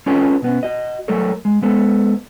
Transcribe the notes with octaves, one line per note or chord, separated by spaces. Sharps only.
C4 C#4 F4 A4 B4 C#5
B2 B3 C#4
F#4 D#5
F#3 A3 A4 A#4 C#5
G#3
G#3 B3 A4 C5